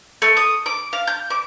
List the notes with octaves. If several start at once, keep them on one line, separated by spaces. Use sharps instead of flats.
A3
D#6
D6
F5
G6
D6